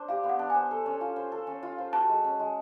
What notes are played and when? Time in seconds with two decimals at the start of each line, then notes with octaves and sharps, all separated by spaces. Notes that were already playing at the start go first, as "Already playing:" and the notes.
Already playing: D4 C5
0.09 G4 F5
0.24 B3
0.29 F#5
0.39 D4
0.50 C5 G#5
0.71 A4
0.86 C#4
1.01 F4
1.16 C5
1.32 A4
1.47 C#4
1.63 F4
1.78 C5
1.93 F#4 A5
2.09 G#3
2.24 C#4
2.40 G#3